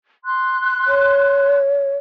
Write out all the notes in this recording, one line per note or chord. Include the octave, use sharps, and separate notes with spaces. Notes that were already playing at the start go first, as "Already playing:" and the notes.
C6 F#6
C#5